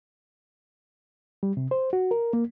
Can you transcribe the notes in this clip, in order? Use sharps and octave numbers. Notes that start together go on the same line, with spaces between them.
G3
C3
C5
F#4
A#4
A#3